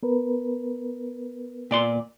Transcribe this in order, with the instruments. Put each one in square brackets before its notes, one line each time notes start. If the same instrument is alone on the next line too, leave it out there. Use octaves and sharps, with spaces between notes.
[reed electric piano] B3 A#4 B4
[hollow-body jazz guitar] A#2 D5 C6